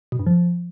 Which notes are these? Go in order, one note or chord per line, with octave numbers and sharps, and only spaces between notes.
B2
G2
F3